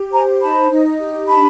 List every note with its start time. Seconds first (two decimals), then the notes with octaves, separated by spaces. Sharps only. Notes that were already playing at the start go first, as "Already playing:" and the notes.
Already playing: G4
0.12 C5 G#5 A#5
0.41 D#4 A5 B5
0.70 D#4
1.00 G4
1.28 D4 A5 B5